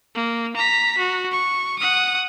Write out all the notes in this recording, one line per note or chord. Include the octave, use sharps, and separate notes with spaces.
A#3
A#5 B6
F#4
C#6
F#5 D#6